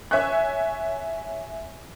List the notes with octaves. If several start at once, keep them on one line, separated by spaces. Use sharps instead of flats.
C#5 E5 G#5 C#6 F#6